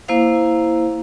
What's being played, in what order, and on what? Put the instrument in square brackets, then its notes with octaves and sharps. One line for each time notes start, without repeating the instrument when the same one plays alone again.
[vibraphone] A#3 E4 C5 F5